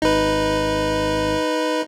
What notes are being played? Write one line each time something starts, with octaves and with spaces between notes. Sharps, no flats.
G#1 D#4 B4